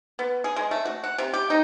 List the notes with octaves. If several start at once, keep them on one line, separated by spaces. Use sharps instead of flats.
B3
G#4
G#3
A3
F#4
F#5
C3
G4
D#4